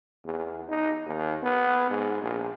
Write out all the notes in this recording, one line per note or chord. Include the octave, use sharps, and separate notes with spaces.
E2
D#4
D#2
B3
G#2
A#1